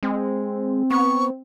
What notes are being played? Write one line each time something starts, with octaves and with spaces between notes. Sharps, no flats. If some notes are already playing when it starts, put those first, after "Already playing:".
G#3 C4
B3 C#6